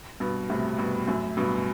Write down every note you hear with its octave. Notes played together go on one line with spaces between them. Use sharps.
G2 B2
A2 C3
G2 B2
F#2 A2
G2 B2